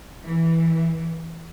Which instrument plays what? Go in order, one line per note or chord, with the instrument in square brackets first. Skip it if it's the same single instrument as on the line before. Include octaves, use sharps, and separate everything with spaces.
[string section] E3